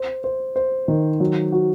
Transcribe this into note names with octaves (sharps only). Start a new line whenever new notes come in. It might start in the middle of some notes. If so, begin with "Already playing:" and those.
Already playing: C5
C5
C5
D#3
F#3
F#4